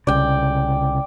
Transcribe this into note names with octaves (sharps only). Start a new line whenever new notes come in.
C2 C#3 D5 G5